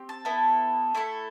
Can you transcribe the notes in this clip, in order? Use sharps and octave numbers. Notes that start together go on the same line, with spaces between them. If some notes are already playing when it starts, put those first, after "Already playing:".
Already playing: C4 G4
A5
B3 E4 A4
A3 E4 A4